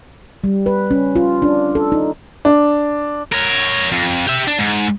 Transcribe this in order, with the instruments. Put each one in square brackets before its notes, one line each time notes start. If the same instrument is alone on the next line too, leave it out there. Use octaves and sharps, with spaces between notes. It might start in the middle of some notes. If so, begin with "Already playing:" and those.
[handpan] G3
B4
C#4
F4
D4
A4
D#4
[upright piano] D4
[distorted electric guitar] A#4 C#5
F2
G4 E5
D4
G#2